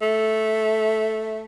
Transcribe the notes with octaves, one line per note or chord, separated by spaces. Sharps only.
A3